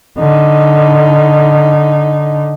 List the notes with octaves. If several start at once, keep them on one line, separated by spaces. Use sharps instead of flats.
D3 D#4